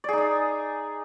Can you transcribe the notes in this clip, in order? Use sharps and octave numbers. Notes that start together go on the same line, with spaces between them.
D#4 G#4 D5 D#5